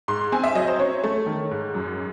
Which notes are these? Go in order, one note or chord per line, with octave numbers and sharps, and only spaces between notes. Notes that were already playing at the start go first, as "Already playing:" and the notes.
G#2 C6
C4 G#5
E5
F#3 D#5
C5
C#4 C#5
A3
D#3
G#2
F#2